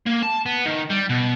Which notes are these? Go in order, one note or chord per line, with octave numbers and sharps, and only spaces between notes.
A#3
A5
B3
D#3
G3
B2